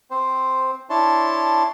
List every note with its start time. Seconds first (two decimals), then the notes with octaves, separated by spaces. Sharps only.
0.11 C4 C5
0.90 D4 E4 C#5 A5 C6